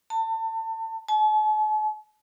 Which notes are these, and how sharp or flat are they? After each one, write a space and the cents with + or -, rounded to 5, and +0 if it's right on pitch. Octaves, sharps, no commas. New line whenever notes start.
A5 +30
A5 -45